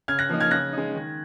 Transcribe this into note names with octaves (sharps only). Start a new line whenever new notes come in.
C#3 F6 G#6
F#6 A#6
F3 A#3 D#4
F6 G#6
C#3 F#6 A#6
G#3 D#4
D#3